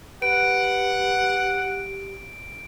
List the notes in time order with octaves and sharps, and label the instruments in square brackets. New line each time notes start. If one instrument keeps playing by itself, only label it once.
[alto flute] G4 [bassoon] B4 [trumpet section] F#5 [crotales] D7